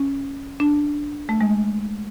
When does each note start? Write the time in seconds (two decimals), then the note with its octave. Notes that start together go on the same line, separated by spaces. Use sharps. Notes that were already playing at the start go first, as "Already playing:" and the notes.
Already playing: C#4
0.60 D4
1.29 A3
1.41 G#3